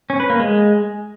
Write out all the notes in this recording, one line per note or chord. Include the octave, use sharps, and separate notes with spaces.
C#4
B4
A#3
G#3